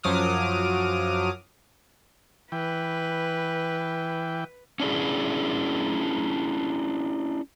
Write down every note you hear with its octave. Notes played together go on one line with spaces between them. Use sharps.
F#2 F3 F#3 D6 D#6 F6
E3 B4 G5
C#4 D4 E4 G#4